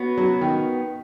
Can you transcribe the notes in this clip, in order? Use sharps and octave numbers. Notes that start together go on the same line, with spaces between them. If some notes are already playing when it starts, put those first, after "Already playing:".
Already playing: B3 F#4 C#5
F#3
D#3